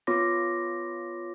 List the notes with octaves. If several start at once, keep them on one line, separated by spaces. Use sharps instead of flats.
B3 F4 C#5 C6 D6 A#6